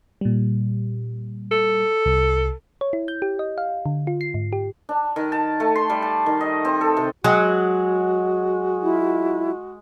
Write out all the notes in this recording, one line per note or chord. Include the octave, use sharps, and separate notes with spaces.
A#2 G3
A4
C2
C#5
E4
G6
G4
D#5
F5
D3
F4
C7
G#2
G4
D4
D#3
A5
A3
C6
G3
A5
D#3
D#5
C4
A4
C3
F#3 G#3 F#4
E4 F4